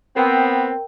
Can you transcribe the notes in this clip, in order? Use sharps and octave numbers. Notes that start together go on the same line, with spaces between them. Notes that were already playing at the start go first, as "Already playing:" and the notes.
B3 C4 A#4 G5